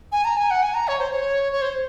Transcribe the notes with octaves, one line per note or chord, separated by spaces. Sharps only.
G#5
A#5
G#5
F#5
G#5
A#5
C#5
C5
C#5
C#5
C5